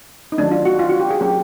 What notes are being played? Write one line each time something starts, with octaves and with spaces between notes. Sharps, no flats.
D#4
D#3 F#3 A3 C#4 D4
F4
F#4
F4
F#4
G4
G#4
F#3 A#3 C#4 G4